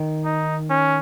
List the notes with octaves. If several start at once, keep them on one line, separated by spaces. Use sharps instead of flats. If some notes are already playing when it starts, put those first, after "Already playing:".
Already playing: D#3
D#4
C#4